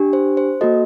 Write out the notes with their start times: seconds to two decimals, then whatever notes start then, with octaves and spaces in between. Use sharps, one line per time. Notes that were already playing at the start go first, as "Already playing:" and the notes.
Already playing: D4 G4
0.13 C5
0.37 C5
0.61 A#3 F#4 A4 D#5